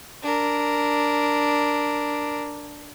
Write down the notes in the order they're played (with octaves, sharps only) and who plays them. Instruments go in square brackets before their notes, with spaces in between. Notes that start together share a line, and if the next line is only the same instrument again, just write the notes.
[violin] D4 A#4